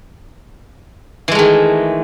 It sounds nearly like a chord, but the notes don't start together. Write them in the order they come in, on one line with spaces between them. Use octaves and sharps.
E3 G#3 A3 D#3